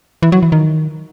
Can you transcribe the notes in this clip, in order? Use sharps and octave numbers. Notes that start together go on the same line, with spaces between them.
E3
F#3
E3
D#3